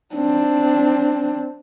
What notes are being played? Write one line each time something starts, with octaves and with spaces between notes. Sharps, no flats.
C4 D4